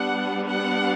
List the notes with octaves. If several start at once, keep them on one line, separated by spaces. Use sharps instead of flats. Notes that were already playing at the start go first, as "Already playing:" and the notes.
Already playing: G3 B3 D4 F#5
F#5